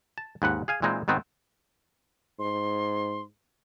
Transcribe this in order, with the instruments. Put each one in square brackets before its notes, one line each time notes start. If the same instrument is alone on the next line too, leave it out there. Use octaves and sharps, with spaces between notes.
[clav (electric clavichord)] A5
D#2 G#2 B4 F#5
G#4 F5 G#5
A#2 E3 G#3 C4 D#4
G#2 D#3 B3 C4
[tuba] G#2 [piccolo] C6